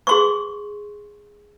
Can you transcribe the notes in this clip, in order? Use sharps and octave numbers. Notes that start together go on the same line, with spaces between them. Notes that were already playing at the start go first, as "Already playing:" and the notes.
G#4 C6 C#6